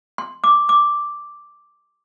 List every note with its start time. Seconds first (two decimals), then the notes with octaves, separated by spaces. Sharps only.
0.18 C6
0.44 D6
0.69 D6